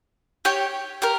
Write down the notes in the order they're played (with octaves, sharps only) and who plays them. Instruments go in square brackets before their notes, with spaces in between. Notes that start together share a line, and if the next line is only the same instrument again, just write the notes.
[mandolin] G4 C#5 G5
G4 A#4